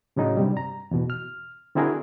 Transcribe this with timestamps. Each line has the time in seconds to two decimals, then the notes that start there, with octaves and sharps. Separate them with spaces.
0.16 A2 C#3 F#3 D#4
0.37 G2 C3 G3
0.57 A#5
0.91 E2 B2
1.10 F6
1.75 D3 C4 E4 F#4 G#4 A#4